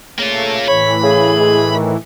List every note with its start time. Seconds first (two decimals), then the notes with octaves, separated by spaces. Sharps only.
0.19 C#3 A3 A#3 F4
0.68 A2 E3 C#5 B5
1.03 C#3 G#4
1.40 G#3
1.74 D#3